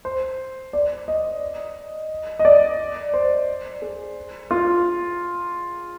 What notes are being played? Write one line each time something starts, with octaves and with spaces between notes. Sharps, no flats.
C5
D5
D#5
D#5
D5
C5
G#4
F4